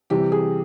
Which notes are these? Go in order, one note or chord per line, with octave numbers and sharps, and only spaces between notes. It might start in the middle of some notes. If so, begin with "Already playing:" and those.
C3 E3 G3 G4
G#4